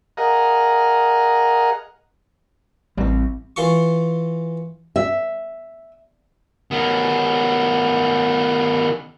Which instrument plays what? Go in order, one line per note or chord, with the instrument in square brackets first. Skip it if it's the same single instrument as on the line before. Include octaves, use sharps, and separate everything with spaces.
[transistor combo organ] G#4 A#4 D#5 F5 F#5 A#5
[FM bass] A1 [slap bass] G3 C4
[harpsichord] E3 F4 C6 C#6
[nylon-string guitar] E5
[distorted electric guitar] D#3 B3